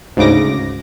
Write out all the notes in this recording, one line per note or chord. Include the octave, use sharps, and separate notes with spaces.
D2 G#2 C#3 D6 A#6